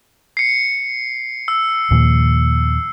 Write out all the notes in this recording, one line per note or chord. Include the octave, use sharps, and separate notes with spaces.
C7 C#7
E6
D#2 A#2 F3